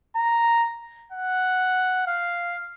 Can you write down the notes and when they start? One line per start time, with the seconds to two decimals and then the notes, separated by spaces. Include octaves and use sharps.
0.16 A#5
1.12 F#5
2.07 F5